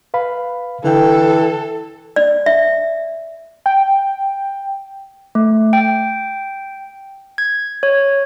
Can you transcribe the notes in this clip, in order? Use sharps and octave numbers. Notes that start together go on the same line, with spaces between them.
B4 F5 B5
D3 E3 A4 G5
D5
E5
G5
A3
G5
G#6
C#5